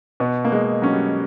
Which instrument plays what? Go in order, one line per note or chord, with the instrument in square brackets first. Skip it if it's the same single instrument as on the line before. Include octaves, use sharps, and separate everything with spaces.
[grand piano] B2 [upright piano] B3
[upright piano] A#3
[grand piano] G#3
[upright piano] F#3 [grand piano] C#4
[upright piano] G3